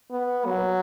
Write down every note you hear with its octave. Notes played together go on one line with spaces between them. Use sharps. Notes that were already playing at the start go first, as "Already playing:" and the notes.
B3
F#3